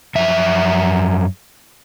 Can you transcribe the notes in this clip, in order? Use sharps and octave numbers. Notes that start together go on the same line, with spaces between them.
F#2 F3 E5